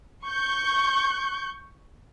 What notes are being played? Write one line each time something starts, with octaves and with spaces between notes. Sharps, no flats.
C#6 G6